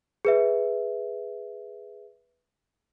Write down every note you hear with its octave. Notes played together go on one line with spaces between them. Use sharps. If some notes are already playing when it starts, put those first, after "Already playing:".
G#4 B4 E5